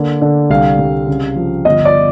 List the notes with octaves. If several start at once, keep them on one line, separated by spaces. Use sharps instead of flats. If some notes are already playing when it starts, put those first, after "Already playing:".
Already playing: D3 A#3
D3
C2 F5
C2
C#3
F3
G1 D#5
D5